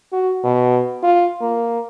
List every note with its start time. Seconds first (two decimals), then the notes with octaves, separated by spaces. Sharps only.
0.13 F#4
0.44 B2
1.03 F4
1.41 A#3